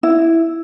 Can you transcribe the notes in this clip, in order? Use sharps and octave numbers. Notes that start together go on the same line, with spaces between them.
E4